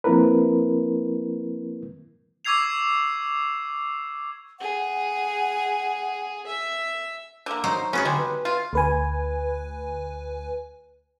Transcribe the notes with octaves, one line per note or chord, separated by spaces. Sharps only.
F3 A#3 C4 E4 A#4 B4
C#6 D6 E6 G#6 C7 F7
G#4 F#5
E5
D3 A#3
F#3 D#4 C5
B3 C#4 F#4 G#4
D3 G3 G#3
B4
F4
D2 B4 G#5